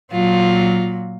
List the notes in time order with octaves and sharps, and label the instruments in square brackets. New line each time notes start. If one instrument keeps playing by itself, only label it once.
[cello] A#2 F#3 [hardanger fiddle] F4